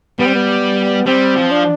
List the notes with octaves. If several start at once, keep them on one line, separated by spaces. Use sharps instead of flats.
G3 B3
C4
B3
G3 C4
F3
D4